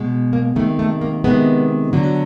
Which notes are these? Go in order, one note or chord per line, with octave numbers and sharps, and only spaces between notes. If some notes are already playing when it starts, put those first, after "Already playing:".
Already playing: B2 G#3
A#3
C3 D#3 G#3 A3
A3
A#3
C3 D#3 G#3 B3
D3 F#3